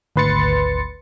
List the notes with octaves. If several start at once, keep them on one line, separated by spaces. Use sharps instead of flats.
G#1 D2 B4 C6 A6 C#7